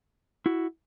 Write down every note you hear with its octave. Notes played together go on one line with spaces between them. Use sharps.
E4 F#4